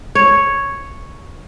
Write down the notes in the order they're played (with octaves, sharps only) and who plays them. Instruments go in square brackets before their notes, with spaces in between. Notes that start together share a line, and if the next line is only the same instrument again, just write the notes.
[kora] C#5